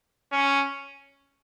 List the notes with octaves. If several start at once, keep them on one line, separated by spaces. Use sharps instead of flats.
C#4